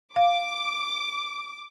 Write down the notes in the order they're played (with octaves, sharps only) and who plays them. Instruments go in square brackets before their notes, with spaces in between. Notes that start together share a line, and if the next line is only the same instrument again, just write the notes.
[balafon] F5 [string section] D6